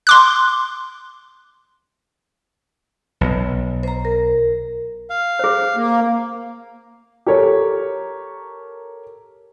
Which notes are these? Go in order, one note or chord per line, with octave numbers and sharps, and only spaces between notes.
C6 D6 F#6
B1
C5 A#5
A#4
F5
G#4 C5
A#3
G4 A4 A#4 C#5